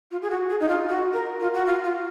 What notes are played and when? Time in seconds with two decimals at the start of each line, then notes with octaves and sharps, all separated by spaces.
0.11 F4
0.22 G#4
0.30 F#4
0.49 G#4
0.60 D#4
0.68 F4
0.89 F#4
1.13 A#4
1.40 F4
1.54 F#4
1.66 F4
1.84 F4